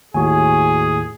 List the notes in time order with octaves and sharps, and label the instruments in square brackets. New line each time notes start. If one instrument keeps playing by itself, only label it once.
[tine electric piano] D#2 A2 [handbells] F#4 G#5 [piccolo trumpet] G#4